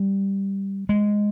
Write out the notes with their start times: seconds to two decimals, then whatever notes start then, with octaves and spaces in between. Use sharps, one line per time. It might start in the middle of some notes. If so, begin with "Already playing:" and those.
Already playing: G3
0.89 G#3